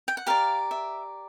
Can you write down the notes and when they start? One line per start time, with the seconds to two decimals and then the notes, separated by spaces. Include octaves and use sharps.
0.08 G5
0.17 F#5
0.27 G4 A#4 D5 F5
0.71 E5